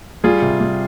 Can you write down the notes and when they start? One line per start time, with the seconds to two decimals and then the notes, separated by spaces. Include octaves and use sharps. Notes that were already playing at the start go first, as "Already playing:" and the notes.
0.24 G3 F4 G#4
0.42 C3
0.60 G3